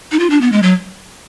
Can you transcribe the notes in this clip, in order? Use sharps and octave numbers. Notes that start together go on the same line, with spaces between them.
D#4
F4
D4
B3
G#3
F#3